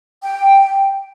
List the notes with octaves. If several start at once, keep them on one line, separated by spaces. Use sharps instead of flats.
G5